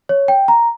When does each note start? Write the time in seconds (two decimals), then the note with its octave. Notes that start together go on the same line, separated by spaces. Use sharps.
0.09 C#5
0.28 G5
0.48 A#5